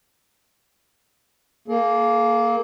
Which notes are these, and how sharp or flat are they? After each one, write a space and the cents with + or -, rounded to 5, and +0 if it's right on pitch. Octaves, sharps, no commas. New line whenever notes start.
A#3 +0 G#4 +40